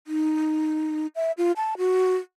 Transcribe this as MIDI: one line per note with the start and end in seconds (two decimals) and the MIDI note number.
0.07 1.07 63
1.16 1.32 76
1.38 1.52 65
1.56 1.74 81
1.78 2.15 66